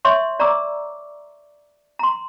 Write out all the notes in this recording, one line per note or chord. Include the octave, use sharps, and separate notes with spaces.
C#5 E5 C6 C#6
D5 A#5 C#6 D6 E6
A#5 C6